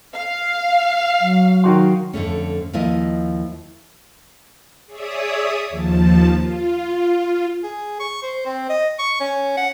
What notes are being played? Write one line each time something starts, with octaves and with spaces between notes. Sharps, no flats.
F5
F#3
D#3 F#4 C6
F2 D3 A3 C#4
D#2 F3 E4 D#5
G#4 C#5 D5 E5 D#6
D#2 F3 A5
F4
G#4
C#6
C5
C4
D#5
C#6
C#4
F#5